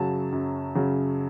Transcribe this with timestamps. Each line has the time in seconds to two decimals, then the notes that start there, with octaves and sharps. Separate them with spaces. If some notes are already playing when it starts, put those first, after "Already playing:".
Already playing: F#2 C#3 F#3 A5
0.32 F#2
0.75 C#3 F#3